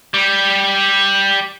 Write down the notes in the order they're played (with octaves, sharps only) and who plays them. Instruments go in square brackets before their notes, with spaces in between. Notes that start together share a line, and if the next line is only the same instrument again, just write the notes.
[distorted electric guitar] G3